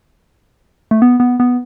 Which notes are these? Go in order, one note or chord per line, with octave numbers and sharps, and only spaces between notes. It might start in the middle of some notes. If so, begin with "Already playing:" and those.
A3
B3
B3
B3